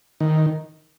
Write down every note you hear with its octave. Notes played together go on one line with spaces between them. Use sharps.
D#3